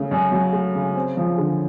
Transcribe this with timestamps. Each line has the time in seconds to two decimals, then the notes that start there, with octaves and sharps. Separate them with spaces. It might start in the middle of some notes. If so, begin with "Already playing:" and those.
Already playing: C#3 A3
0.11 F#2
0.31 F#3
0.52 A3
0.75 C#3
0.95 C4
1.17 F3
1.38 D3